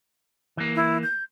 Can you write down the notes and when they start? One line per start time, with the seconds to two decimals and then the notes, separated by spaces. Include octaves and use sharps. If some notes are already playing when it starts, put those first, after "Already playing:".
0.57 E3 A#3
0.75 E4
1.03 G6